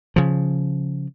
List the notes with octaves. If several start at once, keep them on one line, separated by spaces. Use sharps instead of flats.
C#3 F3